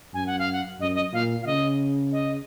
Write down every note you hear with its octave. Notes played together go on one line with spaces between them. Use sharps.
F#2 G#5
F#5
F5
F#5
F#2 D#5
D#5
A#2 F5
F5
C#3 D#5
D#5